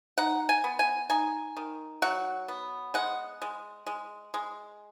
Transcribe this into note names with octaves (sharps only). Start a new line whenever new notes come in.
D#4 F#5
G#5
B3
G#5
D#4 G#5
D#3
F#3 F#5
B3
G#3 F#5
G#3
G#3
G#3